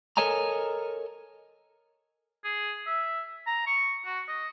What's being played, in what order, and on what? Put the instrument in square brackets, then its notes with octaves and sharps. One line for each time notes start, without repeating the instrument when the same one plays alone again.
[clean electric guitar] A4 A#4 C#5 D#5 G#5 A#5
[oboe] G#4
E5
A#5
C#6
F#4
D#5